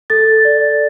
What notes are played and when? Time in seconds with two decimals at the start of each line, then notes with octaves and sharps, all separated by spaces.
0.10 A4 A6
0.45 D5